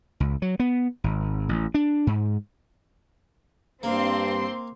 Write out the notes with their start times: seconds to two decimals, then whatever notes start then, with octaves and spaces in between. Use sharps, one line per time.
0.20 C#2
0.42 F#3
0.60 B3
1.04 G#1
1.49 A1
1.74 D4
2.07 G#2
3.83 G2 A#3 C4 C6